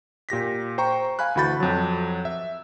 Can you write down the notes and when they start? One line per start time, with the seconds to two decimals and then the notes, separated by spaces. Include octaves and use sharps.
0.29 A#2 G4 A#6 B6
0.78 C5 G5 A#5 C#6
1.19 F5 G#5 B5 F#6
1.35 D2 E3 F#4 B5 G6 A6
1.60 F2 F#3
2.25 E5